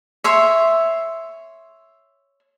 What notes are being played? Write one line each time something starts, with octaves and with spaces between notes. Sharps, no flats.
C#5 E5 C6